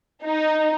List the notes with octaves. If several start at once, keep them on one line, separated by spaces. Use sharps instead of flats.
D#4